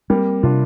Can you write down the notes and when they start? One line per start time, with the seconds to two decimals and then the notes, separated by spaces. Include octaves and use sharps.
0.10 G3 A#3 C4
0.43 C3 D4 F4